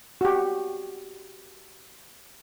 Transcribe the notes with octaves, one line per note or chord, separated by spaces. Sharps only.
F#4 G4